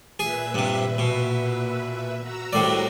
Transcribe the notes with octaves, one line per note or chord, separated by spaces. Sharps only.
A#2 G#4 B4 E5
G2 C3
B2
F#4 A#5 E6
C2 A2 D5